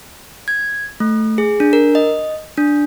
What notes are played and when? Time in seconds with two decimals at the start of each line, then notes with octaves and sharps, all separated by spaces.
0.48 G#6
1.00 A3
1.38 G#4
1.60 D4
1.73 A#4
1.95 D#5
2.57 D4